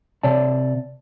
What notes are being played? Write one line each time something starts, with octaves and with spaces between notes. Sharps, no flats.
C3 C#5 D5 A5